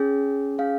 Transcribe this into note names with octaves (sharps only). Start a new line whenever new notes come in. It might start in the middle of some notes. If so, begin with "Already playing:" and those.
Already playing: C#4 G#4
C#4 G#4 F5